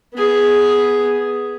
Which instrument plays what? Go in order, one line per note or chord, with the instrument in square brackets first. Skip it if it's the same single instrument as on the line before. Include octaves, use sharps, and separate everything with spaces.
[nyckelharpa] B3 G#4